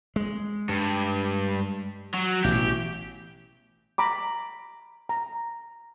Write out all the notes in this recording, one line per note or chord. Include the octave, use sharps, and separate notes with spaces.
G#3
G2
F#3
A1 B2 G4
A#5 B5 D6
A#5